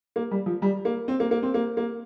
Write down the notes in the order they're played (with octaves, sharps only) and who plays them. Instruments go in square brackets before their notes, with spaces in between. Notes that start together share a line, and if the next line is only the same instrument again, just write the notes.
[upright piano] A#3
G3
F3
G3
A#3
C4
A#3
A#3
C4
A#3
A#3